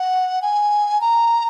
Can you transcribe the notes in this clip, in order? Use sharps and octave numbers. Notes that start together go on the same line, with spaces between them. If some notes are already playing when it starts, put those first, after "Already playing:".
Already playing: F#5
G#5
A#5